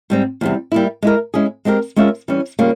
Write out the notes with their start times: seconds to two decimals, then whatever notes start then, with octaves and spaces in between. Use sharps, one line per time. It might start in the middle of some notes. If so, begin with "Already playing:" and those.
0.10 G#2 G3 C4
0.41 E2 C3 G3
0.72 G3 A#3 E4
1.02 G#3 E4 A#4
1.34 G#3 C#4 E4 G#4
1.65 G#3 C4 E4 G4 A#4
1.96 G#3 C#4 F4 A#4 E5
2.28 E3 G3 C#4
2.59 C#3 G3 A#3 F4